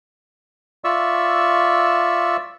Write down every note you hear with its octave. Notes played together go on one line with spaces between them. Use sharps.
F4 D5 E5 C#6 E6